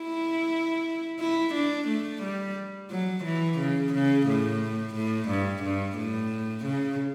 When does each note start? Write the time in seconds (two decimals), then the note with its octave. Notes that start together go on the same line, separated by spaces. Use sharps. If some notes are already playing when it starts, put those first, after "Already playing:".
Already playing: E4
1.20 E4
1.54 D4
1.88 A3
2.22 G3
2.91 F#3
3.24 E3
3.59 C#3
3.93 C#3
4.27 A2
4.95 A2
5.29 G2
5.63 G2
5.98 A2
6.65 C#3